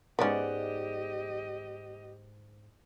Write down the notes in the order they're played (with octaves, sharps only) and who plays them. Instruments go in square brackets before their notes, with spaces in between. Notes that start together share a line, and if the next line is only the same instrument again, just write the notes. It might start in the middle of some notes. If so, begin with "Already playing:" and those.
[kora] G#2 D5 F#5 [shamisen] B3 C#4 [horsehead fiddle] G4 D#5